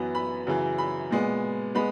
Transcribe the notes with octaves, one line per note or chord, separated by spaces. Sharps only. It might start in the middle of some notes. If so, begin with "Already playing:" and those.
Already playing: F#2 E3 B3
B5
F#2 C#3 E3
B5
A#2 G#3 B3
G#3 B3 B5